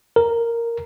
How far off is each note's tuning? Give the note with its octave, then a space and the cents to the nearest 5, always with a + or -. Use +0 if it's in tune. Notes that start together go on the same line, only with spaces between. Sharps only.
A#4 -5